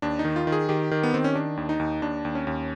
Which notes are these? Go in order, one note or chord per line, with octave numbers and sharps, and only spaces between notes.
D#2 D4
D#4
D#3
F4
D#3
G#4
D#3 G4
D#3
B3
D#3 C4
C#4
D#3 D4
D#2
D#4
D#2
D#2 D4
D#2
C#4
D#2